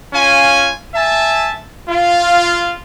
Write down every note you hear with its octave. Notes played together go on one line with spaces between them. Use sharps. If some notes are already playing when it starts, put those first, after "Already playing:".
C#4 F4 F5 G#5
E5 G#5 A5
F4